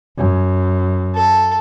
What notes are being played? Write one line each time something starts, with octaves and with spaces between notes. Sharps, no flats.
F#2
A4